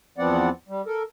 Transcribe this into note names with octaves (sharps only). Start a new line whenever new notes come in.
E2 F3 B3 C4 D5 F#5
G3
A4 A#4